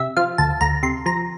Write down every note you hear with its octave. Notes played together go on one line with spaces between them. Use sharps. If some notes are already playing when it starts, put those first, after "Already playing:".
Already playing: C3 E5
F3 F5
D2 A5
D2 A#5
C3 C6
F3 A#5